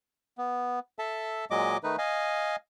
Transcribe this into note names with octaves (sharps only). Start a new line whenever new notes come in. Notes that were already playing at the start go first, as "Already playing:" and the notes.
B3
A4 E5 A5
A#2 F#3 G#3 D#5 D6
D#3 A3 D#4 B4
D#5 F5 G#5